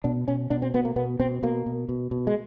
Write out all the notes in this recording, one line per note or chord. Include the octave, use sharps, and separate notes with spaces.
B2 D4
B2 C#4
B2 D4
C4
B2 B3
A#3
B2 B3
B2 C4
B2 A#3
B2
B2
B2
G#3